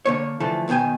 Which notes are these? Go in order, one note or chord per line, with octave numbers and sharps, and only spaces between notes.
D3 A#3 C#5
D3 E3 F3 A3 A4
B1 B2 D#3 G5 G#5